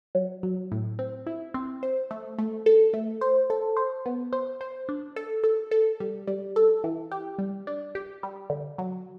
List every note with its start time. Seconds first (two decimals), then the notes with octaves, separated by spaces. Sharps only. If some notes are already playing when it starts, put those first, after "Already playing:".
0.15 F#3
0.43 F#3
0.72 A2
0.99 C4
1.27 E4
1.54 C4
1.83 C5
2.11 A3
2.39 A3
2.66 A4
2.94 A3
3.21 C5
3.50 A4
3.77 C5
4.06 B3
4.33 C5
4.61 C5
4.89 D4
5.16 A4
5.44 A4
5.71 A4
6.00 G3
6.27 G3
6.56 A4
6.84 E3
7.11 G4
7.38 G3
7.67 D4
7.95 G4
8.23 G3
8.50 D3
8.78 F#3